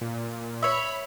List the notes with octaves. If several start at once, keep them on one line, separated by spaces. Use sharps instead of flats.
A#2
C#5 E5 B5